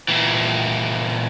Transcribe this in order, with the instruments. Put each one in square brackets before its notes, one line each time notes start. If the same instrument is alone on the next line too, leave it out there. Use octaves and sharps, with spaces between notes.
[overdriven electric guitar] A#2 E3